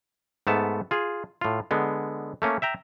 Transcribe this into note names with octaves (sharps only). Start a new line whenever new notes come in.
G#2 A3 B3 A5
F4 G#4
A2 F4
D3 G#3 B3
A3 A#3 C#4
E5 G5 A#5